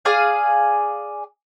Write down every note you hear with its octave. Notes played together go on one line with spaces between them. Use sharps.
G#4 D5 F5 G#5